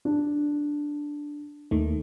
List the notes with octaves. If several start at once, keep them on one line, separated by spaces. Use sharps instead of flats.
D4
D#2 D#3 A3